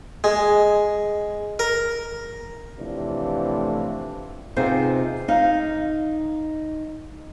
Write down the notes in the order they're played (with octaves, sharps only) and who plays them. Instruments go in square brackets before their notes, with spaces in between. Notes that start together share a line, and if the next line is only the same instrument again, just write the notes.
[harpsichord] G#3
A#4
[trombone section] A2 C3 E3 F3 A3 D4
[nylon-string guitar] C3 B3 D#4 F4 G#4 C5
D#4 F5